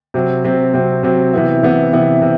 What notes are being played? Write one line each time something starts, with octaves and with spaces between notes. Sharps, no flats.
C3 F#3 C4
C3 F#3 C4
C3 F#3 C4
C3 F#3 C4
C3 E3 B3 E4
C3 E3 B3 E4
C3 E3 B3 E4
C3